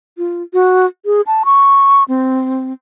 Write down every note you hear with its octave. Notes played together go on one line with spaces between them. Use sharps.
F4
F#4
G#4
A5
C#6
C4